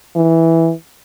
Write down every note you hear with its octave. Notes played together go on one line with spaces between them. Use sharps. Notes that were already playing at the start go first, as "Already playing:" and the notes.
E3